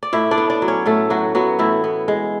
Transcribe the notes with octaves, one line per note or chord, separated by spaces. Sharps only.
D5
A2 E4 E5
D4 D5
B3
D4 D5
F#3
C#4 C#5
A2 A3 A4
A2 F#3 F#4
F#3 B3 F#4
A2 E3 E4
B3
G#3